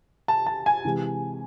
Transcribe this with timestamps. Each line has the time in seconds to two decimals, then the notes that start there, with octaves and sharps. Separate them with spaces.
0.28 A5
0.46 A5
0.66 G#5
0.85 C3 E3 G#3